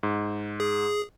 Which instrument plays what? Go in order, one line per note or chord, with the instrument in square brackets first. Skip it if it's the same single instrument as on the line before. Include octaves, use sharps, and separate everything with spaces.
[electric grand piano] G#2
[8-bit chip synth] G#4